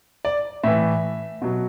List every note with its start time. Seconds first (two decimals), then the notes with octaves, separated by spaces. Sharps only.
0.25 D5
0.63 A2 E3 E5
1.42 B2 F#3